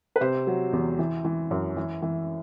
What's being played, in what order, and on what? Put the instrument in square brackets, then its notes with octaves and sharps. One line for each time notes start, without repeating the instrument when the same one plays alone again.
[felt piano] B4
C3 C5
F#3
E2
E3
E3
F#2
E3
E3